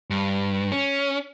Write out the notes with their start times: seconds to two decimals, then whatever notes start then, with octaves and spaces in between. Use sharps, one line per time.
0.10 G2
0.72 C#4